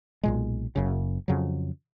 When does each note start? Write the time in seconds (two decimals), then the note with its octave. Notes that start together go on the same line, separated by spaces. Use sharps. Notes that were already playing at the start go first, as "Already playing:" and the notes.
0.23 B1 A#2 G#3
0.76 F#1 F#2 C#3
1.28 F2 C#3 F#3